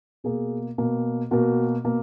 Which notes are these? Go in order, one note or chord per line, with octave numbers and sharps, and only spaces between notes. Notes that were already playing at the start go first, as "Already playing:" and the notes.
B2 A#3 G#4
B2 A#3
B2 A#3 F#4 A#4
B2 A#3